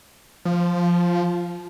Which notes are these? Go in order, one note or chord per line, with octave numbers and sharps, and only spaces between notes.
F3